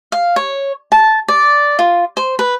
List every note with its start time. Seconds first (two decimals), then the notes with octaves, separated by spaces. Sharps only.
0.12 F5
0.36 C#5
0.92 A5
1.28 D5
1.79 F4
2.17 C5
2.39 B4